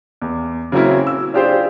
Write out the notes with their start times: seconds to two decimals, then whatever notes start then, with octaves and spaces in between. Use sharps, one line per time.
0.22 E2
0.72 C#3 F#3 A#3 C4 C#4 E4
1.07 E6
1.34 D4 F4 G4 G#4 C5 G5